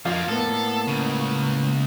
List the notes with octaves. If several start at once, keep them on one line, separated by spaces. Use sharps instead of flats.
F2 F3 A#3 F4 F5
A2 A#3 B3 A4
C#2 C#3